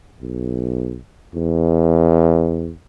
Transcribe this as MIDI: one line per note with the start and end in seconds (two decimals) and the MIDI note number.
0.21 0.99 35
1.34 2.72 40